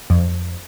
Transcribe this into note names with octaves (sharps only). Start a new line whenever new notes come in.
F2